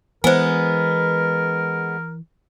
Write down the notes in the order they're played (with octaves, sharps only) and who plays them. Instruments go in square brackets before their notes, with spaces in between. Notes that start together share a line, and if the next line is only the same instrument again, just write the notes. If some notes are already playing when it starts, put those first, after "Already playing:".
[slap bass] E3 [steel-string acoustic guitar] G#3 B3 [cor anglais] A#4 [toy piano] C5 G#5